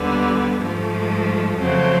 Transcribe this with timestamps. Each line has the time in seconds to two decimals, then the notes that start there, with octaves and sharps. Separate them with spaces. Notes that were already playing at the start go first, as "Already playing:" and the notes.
Already playing: D#2 D3 G3 B3
0.61 G#2 F3 A3
1.59 F2 C#3 F#3 A3 C4